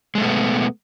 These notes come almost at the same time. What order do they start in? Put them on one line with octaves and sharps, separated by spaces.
G#3 A3 B2 B3